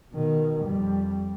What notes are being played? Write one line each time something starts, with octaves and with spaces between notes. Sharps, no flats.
B2 D#3
F2 G3